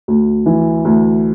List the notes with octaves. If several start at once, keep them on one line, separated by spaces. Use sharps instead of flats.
D2
E3
D2